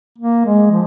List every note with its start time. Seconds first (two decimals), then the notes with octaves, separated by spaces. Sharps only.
0.18 A#3
0.46 G#3
0.71 F3